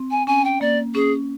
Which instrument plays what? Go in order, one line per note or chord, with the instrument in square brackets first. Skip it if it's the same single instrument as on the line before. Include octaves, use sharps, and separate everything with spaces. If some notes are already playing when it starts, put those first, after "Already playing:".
Already playing: [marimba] C4
[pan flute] G#5
[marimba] C#4 [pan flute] G#5
[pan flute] G5
[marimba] A#3 [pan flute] D5
[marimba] C#4 [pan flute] G#4